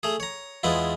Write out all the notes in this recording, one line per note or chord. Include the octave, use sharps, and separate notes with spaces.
A3 G#4
C#5 A#5
E2 G#3 B3 E4 F4